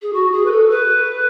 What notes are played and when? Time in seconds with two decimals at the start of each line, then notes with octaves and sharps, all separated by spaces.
0.02 G#4
0.13 F#4
0.32 G#4
0.45 B4
0.50 A4
0.70 B4